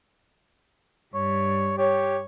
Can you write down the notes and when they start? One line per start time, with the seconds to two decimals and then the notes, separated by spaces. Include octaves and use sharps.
1.14 G2 G3 C#5
1.78 G4 C#5